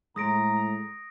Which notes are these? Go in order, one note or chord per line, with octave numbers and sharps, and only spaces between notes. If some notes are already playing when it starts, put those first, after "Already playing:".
A2 G#3 A#5 D#6 A#6 D7